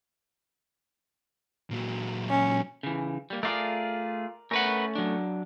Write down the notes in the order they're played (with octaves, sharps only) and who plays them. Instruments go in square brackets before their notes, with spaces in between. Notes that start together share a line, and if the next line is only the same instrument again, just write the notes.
[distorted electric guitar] A#2 F#3
[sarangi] C#4
[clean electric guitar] C#3 E3
G3 A#3
[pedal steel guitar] A3 F4 G#4 [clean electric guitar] A#4 D5
[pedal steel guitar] A3 C#4 [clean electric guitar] A#4 B4 F#5
[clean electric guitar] F#3 D4